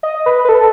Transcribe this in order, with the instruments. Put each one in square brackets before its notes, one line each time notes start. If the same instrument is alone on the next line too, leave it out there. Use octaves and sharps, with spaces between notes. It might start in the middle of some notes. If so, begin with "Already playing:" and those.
[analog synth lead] D#5
B4
B4
A4